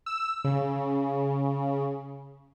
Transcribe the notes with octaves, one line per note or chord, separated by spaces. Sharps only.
E6
C#3